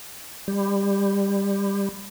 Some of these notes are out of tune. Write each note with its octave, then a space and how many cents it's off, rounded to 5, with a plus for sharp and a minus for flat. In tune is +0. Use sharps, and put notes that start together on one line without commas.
G3 +20